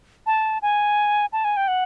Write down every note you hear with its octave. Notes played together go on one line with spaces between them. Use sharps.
A5
G#5
A5
G#5
G5
F#5